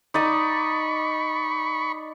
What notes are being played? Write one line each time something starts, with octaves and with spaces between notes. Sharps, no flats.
D#4 D5 B5 C#6 D#6